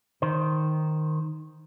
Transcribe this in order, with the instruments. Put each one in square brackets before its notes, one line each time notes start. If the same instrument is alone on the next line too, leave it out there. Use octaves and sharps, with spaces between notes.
[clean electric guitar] D#3 C5